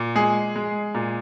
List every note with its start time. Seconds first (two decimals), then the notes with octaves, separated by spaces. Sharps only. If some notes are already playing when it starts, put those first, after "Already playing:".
Already playing: A#2
0.15 G#3 G#4
0.56 G#3
0.95 A#2